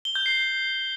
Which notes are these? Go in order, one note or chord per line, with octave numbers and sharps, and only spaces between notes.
G7
G6
C7